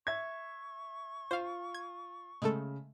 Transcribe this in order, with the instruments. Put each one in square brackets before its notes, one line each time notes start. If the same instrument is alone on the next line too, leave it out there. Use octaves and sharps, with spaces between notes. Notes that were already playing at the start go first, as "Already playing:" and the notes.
[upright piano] E5 G#6 [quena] C#6
[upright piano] F4 [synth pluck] C5 F5
[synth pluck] G#6
[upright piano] C#3 [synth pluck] G#3 A3 A4